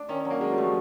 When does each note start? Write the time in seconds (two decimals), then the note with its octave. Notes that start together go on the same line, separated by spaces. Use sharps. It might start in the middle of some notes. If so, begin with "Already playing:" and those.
Already playing: D4
0.09 D#3 C#4
0.20 C#4
0.25 F#3
0.30 A#3
0.41 F#3 G#3
0.52 G3
0.58 A3
0.63 F3